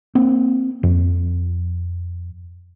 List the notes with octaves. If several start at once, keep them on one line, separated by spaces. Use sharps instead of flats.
A#3 C4
F2